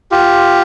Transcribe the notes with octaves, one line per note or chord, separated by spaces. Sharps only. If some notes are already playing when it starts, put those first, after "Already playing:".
F4 G4